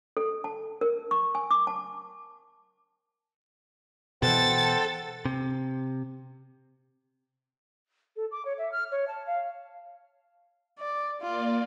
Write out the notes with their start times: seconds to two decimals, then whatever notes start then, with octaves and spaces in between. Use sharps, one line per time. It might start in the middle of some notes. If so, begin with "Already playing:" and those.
0.17 A4
0.44 A5
0.81 A#4
1.11 C#6
1.35 G#5
1.51 D6
1.67 A5
4.23 B2 E3 A4 C5 F#5 G5 A6
5.26 C3
8.16 A4
8.31 D6
8.45 C#5
8.58 E5
8.71 F6
8.91 C#5
9.07 A5
9.26 F5
10.78 D5
11.21 A#3 F4 D5